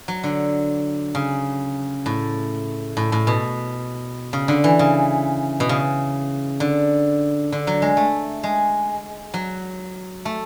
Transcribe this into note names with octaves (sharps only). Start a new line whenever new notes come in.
F#3
D3
C#3
A2
A2
A2
B2
C#3
D3
E3
C#3
B2
C#3
D3
D3
F#3
G#3
A3
G#3
F#3
A3